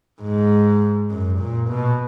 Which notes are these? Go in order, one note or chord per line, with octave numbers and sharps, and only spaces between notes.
G#2
F#2
A#2
B2